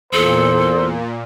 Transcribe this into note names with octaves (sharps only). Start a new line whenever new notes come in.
E2 A#2 A4 C5